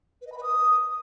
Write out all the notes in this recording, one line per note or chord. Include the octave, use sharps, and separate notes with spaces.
B4
D#5
B5
B4
D#6